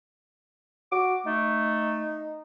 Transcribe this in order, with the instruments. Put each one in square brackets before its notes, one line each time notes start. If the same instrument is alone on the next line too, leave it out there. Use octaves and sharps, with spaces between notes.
[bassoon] F#4 [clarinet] D6
[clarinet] A3 [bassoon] D#4